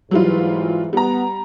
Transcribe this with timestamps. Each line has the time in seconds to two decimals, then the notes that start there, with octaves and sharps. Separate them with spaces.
0.11 G#2 E3 F#3 G3 F4
0.93 G3 B3 A#5